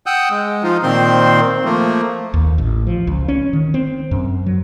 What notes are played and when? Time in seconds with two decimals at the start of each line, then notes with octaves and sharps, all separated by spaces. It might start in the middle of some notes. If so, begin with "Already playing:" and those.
0.06 F#5 G5 D#6 E6 F#6 G6
0.31 G#3
0.63 F3 D#4 F4
0.83 A#2 D#3 C4 C5 C6
1.65 F3 A3 A#3
2.34 D#2
2.58 A1
2.87 F3
3.07 C#2
3.28 C#4
3.53 D#3
3.74 C4
4.11 F#2
4.46 F#3